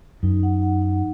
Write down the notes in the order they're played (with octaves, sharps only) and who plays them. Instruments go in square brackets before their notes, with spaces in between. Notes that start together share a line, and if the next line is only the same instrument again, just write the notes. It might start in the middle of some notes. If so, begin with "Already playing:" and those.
[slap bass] F#2 [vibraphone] D#4
[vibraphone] F#5
F#5
F#5